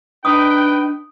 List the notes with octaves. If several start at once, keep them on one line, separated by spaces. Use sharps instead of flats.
D4 D#4 B4 G5 D#6